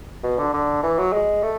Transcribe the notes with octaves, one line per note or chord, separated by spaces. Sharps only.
B2
D3
D3
E3
F#3
G#3
A3